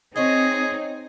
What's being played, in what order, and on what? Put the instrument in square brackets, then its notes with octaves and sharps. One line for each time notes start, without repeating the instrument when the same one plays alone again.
[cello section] C4 D#4 [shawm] G#4 [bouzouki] C#5 D#5